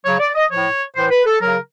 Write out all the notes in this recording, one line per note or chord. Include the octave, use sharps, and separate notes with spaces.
C#3 F#3 C#5
D5
D#5
A2 F3 C#5
A2 E3 C5
B4
A4
C#3 F#3 A#4